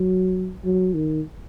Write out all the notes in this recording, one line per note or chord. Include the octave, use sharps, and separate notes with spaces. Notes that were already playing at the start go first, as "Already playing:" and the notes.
Already playing: F#3
F#3
D#3